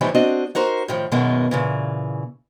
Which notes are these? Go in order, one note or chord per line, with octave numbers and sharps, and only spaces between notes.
A2 E3 F3 G3 D#4 E4
C4 D4 F#4 D#5
D#4 F#4 A#4 C5
A2 D#3 F3
F#2 B2 D#3 G#3 A#3 B3
A#2 C#3 E3